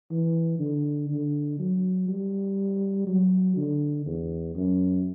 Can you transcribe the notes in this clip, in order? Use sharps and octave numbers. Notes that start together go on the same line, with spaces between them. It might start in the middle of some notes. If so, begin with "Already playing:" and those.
E3
D3
D3
F#3
G3
F#3
D3
E2
F#2